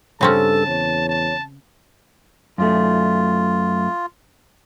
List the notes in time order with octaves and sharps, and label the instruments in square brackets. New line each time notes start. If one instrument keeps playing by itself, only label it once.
[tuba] G2 [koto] C#3 C4 C#4 [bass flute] A4 [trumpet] A5
[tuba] E2 [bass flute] C#5
[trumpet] A5
[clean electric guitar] F#2 A3 [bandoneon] F4